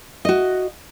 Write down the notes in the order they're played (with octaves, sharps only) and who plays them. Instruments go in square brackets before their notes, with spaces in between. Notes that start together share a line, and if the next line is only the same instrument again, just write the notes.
[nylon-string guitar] F#4 D#5